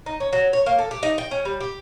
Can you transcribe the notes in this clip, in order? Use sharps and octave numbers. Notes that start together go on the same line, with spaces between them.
D#4
C#4
F#3
C#5
A#3
A4
G4
D#4
G5
C#4
G3
G4